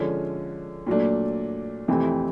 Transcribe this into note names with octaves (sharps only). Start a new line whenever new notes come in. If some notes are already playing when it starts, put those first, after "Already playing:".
Already playing: D3 F3 G#3 C#4
A#2 F#3 A3 D4
F2 C3 E3 A3 C4